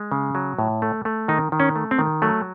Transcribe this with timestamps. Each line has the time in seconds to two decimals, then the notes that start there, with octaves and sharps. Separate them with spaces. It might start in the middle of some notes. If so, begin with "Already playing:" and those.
Already playing: G#3
0.12 C#3
0.35 F#3
0.59 A2
0.82 A3
1.05 A3
1.28 D#3 D#4
1.52 D#3
1.60 C#4
1.76 A3
1.91 C4
1.99 D#3
2.22 F#3 A3